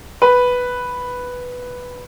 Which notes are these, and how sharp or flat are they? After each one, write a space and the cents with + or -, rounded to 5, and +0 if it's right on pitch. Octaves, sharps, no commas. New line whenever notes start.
B4 +0